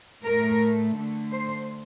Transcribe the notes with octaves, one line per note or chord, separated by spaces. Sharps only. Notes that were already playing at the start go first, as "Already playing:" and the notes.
A2 A3 A#4
D3 A3
C5